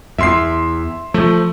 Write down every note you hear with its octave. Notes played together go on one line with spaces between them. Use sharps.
E2 E5 C6 C7
F3 A3